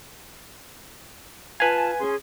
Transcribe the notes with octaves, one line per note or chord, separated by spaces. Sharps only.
F4 B4 F5 G#5 A5
C#4 G#4 C6